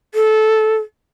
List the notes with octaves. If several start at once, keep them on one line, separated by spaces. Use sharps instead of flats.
A4